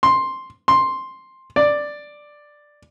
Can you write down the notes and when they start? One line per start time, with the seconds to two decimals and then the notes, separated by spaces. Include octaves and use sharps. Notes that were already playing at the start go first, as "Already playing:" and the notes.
0.03 C6
0.68 C6
1.56 D5